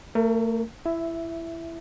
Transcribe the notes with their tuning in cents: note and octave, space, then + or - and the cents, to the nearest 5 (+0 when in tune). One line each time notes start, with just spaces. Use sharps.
A3 +35 A#4 +0
E4 +20 E5 +0